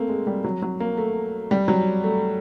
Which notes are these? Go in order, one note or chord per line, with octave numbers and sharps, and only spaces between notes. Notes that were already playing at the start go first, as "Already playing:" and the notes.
Already playing: A3 A#3 C4
G#3
G3
F#3
F#3
A#3
A3
G3
F#3
A3